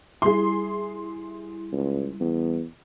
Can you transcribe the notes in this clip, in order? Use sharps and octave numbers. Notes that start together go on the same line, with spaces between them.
G3 E4 G#4 C6
C#2
E2